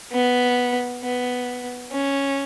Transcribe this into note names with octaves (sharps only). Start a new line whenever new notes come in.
B3
B3
C#4